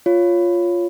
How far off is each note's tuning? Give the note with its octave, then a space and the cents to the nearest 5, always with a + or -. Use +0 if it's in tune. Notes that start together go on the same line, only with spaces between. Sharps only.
F4 +0 C#5 +0